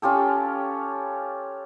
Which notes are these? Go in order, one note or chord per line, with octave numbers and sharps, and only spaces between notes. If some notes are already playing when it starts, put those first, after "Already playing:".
C#4 F4 G4 A4